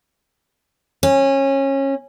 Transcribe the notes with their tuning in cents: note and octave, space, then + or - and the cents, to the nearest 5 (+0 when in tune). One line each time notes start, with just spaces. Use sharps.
C#4 -25